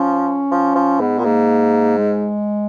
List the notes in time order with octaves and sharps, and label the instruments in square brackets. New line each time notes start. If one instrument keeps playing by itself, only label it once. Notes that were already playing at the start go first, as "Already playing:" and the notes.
Already playing: [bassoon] F3 [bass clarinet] C#4
[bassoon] F3
F3
[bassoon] G#2 [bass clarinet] B3
[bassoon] A#2
[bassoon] G#2 [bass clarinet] A#3
[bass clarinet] G#3